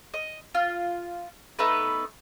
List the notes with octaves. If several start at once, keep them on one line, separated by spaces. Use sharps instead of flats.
D#5
F4
A3 B3 D#4 B4